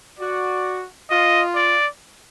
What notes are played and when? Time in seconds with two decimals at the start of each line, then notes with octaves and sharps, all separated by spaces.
0.19 F#4 D5
1.10 F4 D#5
1.55 D5